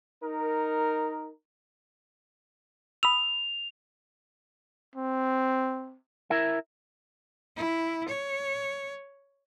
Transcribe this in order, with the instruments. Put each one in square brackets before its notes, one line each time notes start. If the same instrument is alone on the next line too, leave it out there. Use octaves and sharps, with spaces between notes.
[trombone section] D#4 A#4
[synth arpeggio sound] B5 D#6 E6 [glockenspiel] F7
[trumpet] C4
[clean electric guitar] E4 A#4 E5
[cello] E4
C#5